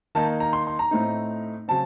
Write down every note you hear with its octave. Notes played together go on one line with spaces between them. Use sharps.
D#3 A#3 D#4 A5
A#5
C6
C6
A#5
A2 A3 C4 D#4
C#3 F#3 C4 A5